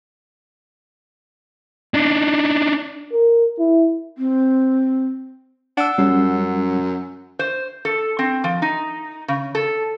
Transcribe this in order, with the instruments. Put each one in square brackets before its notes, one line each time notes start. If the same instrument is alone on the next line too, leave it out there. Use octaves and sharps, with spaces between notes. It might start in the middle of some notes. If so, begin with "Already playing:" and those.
[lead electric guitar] D4 D#4
[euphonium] A#4
E4
[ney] C4
[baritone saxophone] D4 [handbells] F#5 E6
[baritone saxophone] F#2 [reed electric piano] G3 C#4
[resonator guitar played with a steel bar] C5
A4
C4
F3
D#4
C#3
A4